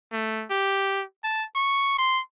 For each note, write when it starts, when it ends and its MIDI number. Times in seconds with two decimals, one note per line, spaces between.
0.12 0.45 57
0.50 1.04 67
1.24 1.44 81
1.55 1.96 85
1.98 2.21 84